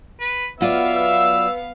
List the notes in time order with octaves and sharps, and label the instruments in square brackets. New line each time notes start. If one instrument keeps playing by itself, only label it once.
[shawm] B4
[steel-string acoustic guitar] F#3 F4 D5 [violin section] B3 F5 [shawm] E5
[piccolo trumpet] E6